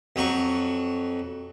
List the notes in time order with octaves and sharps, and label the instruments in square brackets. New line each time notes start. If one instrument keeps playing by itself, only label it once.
[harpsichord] F2 F#3 C#6